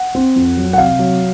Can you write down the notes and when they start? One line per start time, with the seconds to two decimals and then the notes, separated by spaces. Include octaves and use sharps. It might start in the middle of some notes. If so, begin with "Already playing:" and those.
Already playing: F#5
0.15 C4
0.36 F2
0.57 F#3
0.73 F#5
0.78 C3 F5
0.99 F#3